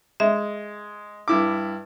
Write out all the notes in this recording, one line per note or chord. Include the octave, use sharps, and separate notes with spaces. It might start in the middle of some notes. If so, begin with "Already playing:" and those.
G#3 E5
G2 E4 D6